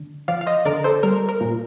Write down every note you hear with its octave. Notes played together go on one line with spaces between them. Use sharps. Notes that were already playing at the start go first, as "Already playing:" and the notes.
Already playing: D3
F3 D5 F5
F5
C5 D#5
D3 A#4 D5
A4 C5
G3 A#4
A#4
A#2